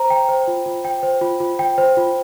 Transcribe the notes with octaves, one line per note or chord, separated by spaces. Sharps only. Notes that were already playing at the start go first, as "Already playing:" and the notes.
Already playing: C5 A#5
G5
C5
F4
F4
G5
C5
F4
F4
G5
C5
F4